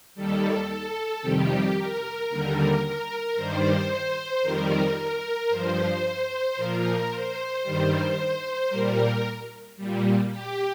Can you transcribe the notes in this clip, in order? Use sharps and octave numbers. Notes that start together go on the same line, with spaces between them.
D#2 D#3 G3 A4
A4
F2 C3 D#3 G3 G4
A#4
D#2 D3 G3
A#4
G2 D#3 G3 C5
F2 D#3 G3 A#4
A#4
G2 F3 C5
A#2 F3 A#4
C5
G2 D#3 G3
A#2 G3 A#4
A#2 G3
G4